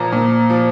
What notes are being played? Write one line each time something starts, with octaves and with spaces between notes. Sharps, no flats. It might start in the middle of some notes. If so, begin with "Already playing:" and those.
Already playing: A#2 F3 A#5
A#2
F3